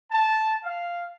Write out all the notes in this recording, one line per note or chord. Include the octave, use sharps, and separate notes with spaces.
A5
F5